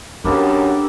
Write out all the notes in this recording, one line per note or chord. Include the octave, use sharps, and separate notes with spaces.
F#2 A#3 B3 D4 G4 A4